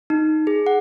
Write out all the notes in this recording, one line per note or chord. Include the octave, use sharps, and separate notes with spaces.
D#4
G#4
F#5